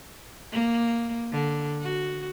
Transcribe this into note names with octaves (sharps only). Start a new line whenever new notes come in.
A#3
D3
F#4